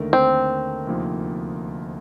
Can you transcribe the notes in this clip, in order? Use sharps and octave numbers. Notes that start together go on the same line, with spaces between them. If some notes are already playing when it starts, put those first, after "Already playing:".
Already playing: D#2 D3 A3 D#4 A#4
C4
D2 C3 F3 A#3 D#4